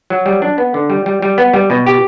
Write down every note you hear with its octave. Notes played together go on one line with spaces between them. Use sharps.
F#3
G3
D4
B3
D3
G3
G3
G3
B3
G3
B2
G4